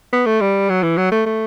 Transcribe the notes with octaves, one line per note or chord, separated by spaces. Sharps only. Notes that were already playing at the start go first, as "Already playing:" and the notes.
B3
A3
G3
F#3
E3
F#3
A3
A3